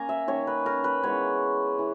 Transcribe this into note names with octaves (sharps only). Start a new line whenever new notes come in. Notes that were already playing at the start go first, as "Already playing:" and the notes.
Already playing: A#3 C#4 G#5 A#5
E5
D#3 A#3 C#4 C#5
B4
A#4
B4
E3 G#3 B3 C#5
E3